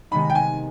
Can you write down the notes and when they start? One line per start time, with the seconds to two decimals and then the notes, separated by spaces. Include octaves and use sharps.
0.11 C3 D#3 G#3 B3 D#4 B5
0.30 G5
0.35 G#5